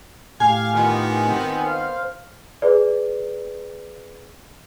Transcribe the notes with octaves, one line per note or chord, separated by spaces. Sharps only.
A2 G4 F5 G#5
D#3 B3 F4
C4
C5 F5
G#4 B4 D5